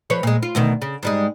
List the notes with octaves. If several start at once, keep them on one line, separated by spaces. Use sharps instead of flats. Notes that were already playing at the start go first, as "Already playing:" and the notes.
F3 B4 C#5
A#2 G#3
F4
D2 B2 D#3
C#3
G#2 G3 G#3